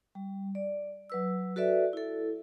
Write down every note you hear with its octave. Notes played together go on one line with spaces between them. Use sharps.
G3
D5
F#3 B4 E6
F#4 A4 B4 D5 E5
E4 A4